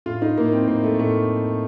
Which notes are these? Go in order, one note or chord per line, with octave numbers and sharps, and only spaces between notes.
A2 F4
D#4
A2 A#3
C4
A2 A#3
A3
A2 A3